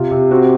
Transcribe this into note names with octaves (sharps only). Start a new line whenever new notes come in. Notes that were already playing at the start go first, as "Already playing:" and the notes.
Already playing: C3 F4
C3
C4 F#4